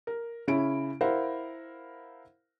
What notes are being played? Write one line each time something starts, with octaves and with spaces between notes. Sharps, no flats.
A#4
C#3 C#4 E4 D7
E4 A#4 C5 F5 F#5